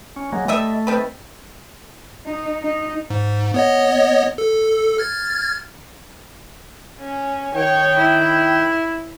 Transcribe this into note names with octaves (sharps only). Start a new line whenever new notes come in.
C#4
F#3 G#3 A#3
G3 A3 D#5 E5
D#3 C4 B4
D#4
D#4
G#2
B3 C#5 D#5
A4
F6 G#6 A6
C#4
D#3 C#5 G5
E4